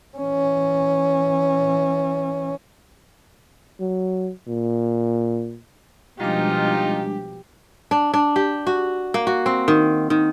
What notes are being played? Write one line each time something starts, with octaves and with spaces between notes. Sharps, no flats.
E3 C#4
F#3
A#2
B2 F3 G3 G#3 D4 D#4 F4 G4
D4
D4
G4
F#4
A#3
F#4
C4
D#3
D#3